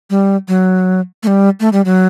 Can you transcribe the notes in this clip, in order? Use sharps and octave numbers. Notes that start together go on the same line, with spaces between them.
G3
F#3
A3
G3
A3
G3
F#3